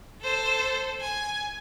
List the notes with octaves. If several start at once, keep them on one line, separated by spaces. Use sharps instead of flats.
A4 C5
G#5